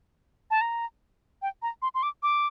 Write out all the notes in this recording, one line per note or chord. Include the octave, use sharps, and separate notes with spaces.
A5
A#5
G5
A#5
C6
C6
D6
D6